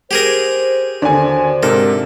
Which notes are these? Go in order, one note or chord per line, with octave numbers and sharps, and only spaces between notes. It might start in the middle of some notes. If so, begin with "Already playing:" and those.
G4 G#4 A#4 C5
D#2 D3 D4 F#4 C5 G#5
G#2 C3 A4 A#4